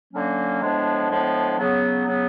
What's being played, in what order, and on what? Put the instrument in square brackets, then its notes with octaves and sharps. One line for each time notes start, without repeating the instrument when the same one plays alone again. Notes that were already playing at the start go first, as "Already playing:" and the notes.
[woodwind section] D3 F#3 A#3 C#4
A2 F3 G#3 B3 D4
A2 F3 G#3 B3 D4
C#3 F#3 B3
C#3 F#3 B3